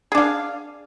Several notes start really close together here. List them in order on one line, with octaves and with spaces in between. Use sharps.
G#4 D4 F5